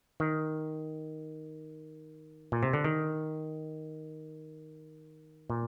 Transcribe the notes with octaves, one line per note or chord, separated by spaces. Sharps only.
D#3
A#2
C3
D3
D#3
A#2